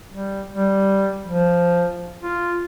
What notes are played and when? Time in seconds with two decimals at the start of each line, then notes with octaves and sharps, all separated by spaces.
0.09 G3
0.53 G3
1.27 F3
2.23 F4